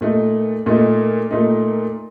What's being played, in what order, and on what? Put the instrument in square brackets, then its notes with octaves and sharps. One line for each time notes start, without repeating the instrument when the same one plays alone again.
[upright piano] A#2 A3 D#4
A#2 A3 D#4
A#2 A3 D#4